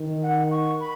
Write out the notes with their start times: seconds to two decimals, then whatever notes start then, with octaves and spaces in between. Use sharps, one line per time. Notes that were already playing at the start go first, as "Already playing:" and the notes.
Already playing: D#3
0.23 F#5
0.51 C#6
0.80 B5